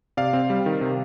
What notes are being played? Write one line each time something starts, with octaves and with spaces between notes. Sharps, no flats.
C3 D5 F5
C4
G3
D#3
C3